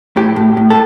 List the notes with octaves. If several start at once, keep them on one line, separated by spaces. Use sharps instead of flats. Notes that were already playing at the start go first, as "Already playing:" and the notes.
A2 G4
A2
A2
A4